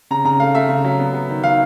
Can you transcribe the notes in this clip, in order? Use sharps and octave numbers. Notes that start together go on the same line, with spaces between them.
C#3 A#5
C#3 A#5
A3 F5
A3 E5
C#3
F#3
B3
B3
D#3
D#3 F5